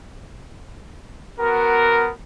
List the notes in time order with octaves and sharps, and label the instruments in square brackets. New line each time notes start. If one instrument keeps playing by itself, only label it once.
[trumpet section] B3 F#4 A#4